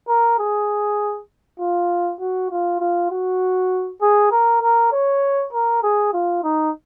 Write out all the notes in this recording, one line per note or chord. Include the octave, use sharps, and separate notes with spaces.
A#4
G#4
F4
F#4
F4
F4
F#4
G#4
A#4
A#4
C#5
A#4
G#4
F4
D#4